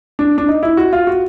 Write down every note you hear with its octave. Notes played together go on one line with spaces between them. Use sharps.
D4
D4
D#4
E4
F#4
F4
F#4